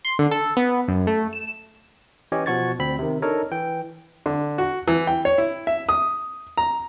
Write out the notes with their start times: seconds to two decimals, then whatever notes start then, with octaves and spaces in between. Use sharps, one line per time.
0.05 C6
0.19 D3
0.31 A4
0.57 B3
0.88 F#2
1.07 A3
1.33 E7
2.32 E3 C#4 G4 C#5 D#5
2.46 B2 F3 F#4 C#6 G#6 A6
2.79 D2 C4 B5
2.99 C3 D#3
3.22 D4 D#4 A4 A#4 C#5 D#5
3.51 E3 G5
4.26 D3
4.58 F#4
4.88 E3
5.07 G5
5.25 C#5
5.38 E4
5.67 E5
5.89 D#6
6.57 A#5